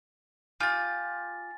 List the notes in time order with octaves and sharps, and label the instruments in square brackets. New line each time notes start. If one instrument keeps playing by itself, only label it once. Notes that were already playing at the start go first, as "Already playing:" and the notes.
[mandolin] F4 G4 [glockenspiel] G#5 A6